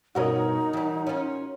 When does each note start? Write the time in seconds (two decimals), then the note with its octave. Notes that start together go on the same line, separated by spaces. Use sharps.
0.15 G2 B2 D#4 F#4 A#4 C#5 D#5
0.73 E3 G3
1.07 C#4 F4